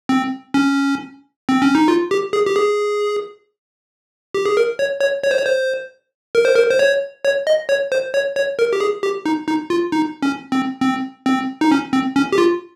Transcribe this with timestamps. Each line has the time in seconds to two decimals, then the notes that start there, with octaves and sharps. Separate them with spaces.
0.09 C4
0.54 C#4
1.49 C4
1.62 C#4
1.75 D#4
1.88 F4
2.11 G4
2.33 G#4
2.46 G4
2.56 G#4
4.34 G4
4.45 G#4
4.57 A#4
4.79 C#5
5.01 C#5
5.23 C#5
5.31 C5
5.38 C#5
5.46 C5
6.35 A#4
6.45 C5
6.55 A#4
6.70 C5
6.79 C#5
7.25 C#5
7.47 D#5
7.69 C#5
7.92 C5
8.14 C#5
8.36 C#5
8.59 A#4
8.73 G4
8.80 G#4
9.03 G4
9.26 D#4
9.48 D#4
9.70 F4
9.92 D#4
10.22 C#4
10.52 C4
10.81 C4
11.26 C4
11.61 D#4
11.72 C#4
11.93 C4
12.16 C#4
12.32 G4
12.38 F4